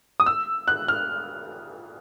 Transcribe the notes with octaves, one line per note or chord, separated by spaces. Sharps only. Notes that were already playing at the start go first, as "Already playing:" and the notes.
D#6
E6
F#6
F6